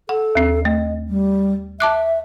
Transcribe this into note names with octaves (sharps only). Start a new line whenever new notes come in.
A4 F#5
D#2 C4
A3 D#5
G3
E5 A5 D6 F#6